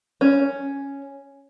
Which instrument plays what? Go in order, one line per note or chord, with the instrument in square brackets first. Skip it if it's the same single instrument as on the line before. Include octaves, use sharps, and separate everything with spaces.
[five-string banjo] C#4